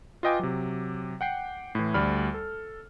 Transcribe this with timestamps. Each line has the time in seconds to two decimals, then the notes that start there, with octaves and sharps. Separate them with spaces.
0.23 F4 B4 D#5 G5 G#5 D6
0.39 C3 F#3
1.21 F#5 G5 C7
1.75 A2 E3
1.94 D2 G3 D5 B5 F6
2.34 A4